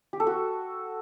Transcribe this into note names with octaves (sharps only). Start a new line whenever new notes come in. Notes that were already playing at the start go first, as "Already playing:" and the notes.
G4
A4
F#4